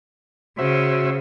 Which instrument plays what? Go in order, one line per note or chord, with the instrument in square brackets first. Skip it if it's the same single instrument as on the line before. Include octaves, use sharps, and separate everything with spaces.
[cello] C#3 [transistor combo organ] F#4 C5 E5